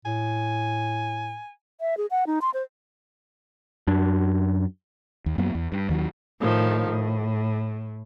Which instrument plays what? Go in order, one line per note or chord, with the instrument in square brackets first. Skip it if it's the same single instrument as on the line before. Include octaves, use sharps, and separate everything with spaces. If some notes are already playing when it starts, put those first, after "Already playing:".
[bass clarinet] A2 [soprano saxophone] G#5
[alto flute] E5
G#4
F#5
D#4
C6
C5
[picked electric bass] F#2 D4
[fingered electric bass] D#2
F#2 F#3 A#3 B3
E2
G2
D#2 D#3 F3 F#3
[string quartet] A2 D#3 F3
A2